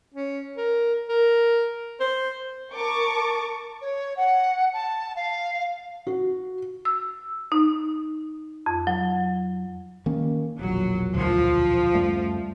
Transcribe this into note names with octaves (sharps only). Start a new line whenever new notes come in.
C#4
A#4
A#4
C5
A#4 A5 C#6 D6
C#5
F#5
A5
F5
F#4
E6
D#4
F2
F#3
D#3 A#3 C#4
E1 A#1 F#3
D2 F3
F#2 G3 A3